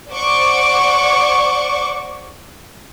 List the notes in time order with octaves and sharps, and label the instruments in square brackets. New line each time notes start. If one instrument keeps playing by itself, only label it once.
[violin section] C5 D5 F#5 C#6 D6